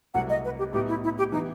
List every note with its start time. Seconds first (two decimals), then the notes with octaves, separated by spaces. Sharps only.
0.14 C2 C3 F#3 A3 F#5
0.29 D#5
0.44 B4
0.58 G4
0.73 A2 F#3 B3 D#4 G4
0.88 E4
1.04 E4
1.18 G4
1.32 E3 B3 D#4 E4